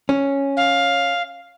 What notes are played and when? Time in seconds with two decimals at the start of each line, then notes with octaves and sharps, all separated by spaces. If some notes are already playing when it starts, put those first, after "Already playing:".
0.09 C#4
0.57 F5